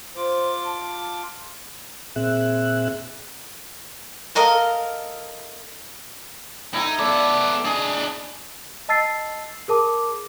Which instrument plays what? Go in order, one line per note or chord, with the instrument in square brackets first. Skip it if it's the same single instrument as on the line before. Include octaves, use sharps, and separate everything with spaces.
[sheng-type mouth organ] F4 D6 [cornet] C5
[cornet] A5
[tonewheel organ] A#2 C4 G#4 E5 F#6
[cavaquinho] A4 A#4 D#5 F5
[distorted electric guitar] D#4 [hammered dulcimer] E4 A4 E5
[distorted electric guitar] B3 A4 [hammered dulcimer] D5
[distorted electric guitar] D4 D#5 [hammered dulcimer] G#4
[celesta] D#5 A5 E6 A6 C7
G#4 A#4 A5 D6